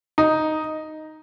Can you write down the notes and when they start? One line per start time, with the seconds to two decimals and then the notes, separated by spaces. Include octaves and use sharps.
0.18 D#4